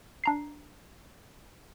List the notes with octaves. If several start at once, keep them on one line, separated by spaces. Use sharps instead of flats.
D4 A#5 C7